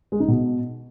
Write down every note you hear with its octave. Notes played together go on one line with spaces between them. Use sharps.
G#3
D#4
B2